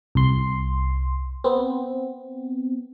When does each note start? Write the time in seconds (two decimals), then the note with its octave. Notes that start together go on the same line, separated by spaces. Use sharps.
0.15 C2 C6
1.44 B3 C4